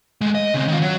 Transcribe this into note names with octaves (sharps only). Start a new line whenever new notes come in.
G#3 A3
D#5
C#3 C4
D#3 F4
F#3